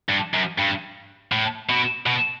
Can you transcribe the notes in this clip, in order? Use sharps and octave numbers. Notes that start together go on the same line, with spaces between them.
G2
F#2
G2
A2
B2
B2